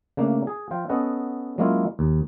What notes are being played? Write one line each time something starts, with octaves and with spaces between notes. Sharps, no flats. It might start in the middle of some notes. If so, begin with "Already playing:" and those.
C#3 A3 A#3 D4
G#4
F3 F4 G5
B3 C#4 A4 D#5 F#5
F#3 G#3 A#3 C#4 E4 F4
D#2